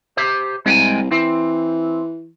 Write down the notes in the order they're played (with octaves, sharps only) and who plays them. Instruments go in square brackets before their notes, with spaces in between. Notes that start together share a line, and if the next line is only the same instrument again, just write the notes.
[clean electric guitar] G4 C5
[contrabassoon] C2 [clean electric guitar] G#3 G5 G#5
[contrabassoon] E3 [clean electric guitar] C4